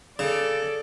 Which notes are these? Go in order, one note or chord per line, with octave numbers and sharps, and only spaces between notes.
C#3 A4 D5